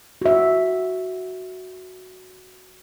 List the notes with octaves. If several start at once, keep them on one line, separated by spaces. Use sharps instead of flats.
F#4 E5